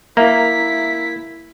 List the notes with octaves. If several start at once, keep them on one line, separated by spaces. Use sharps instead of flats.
A#3 E4 E5 A#5 B6